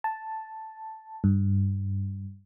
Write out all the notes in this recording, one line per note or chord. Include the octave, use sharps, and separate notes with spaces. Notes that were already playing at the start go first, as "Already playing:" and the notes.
A5
G2